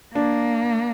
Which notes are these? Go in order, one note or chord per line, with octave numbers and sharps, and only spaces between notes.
A#3 D4